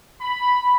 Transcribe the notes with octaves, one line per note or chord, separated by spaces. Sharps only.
B5